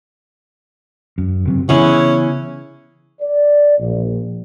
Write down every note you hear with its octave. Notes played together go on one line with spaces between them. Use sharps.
F#2
F#1 C3 F#3
C#3 E3 B3 C#4 E4 G#4 F#5
D5
A#1